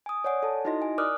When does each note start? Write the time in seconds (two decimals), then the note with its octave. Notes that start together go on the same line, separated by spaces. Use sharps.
0.06 G#5 D#6
0.24 C#5 D5 F#5 G#5
0.43 A4 A5
0.65 D#4 E4 F#4 D#5 C6 A#6
0.82 G#5
0.98 A#4 D5 D6 D#6 F6 F#6